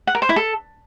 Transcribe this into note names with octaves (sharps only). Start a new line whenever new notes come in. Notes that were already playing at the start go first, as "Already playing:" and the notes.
F#5
A#4
C5
E4
A4